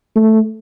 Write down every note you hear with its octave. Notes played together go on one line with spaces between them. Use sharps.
A3